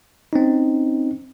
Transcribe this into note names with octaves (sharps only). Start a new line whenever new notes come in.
C4 C#4 D#4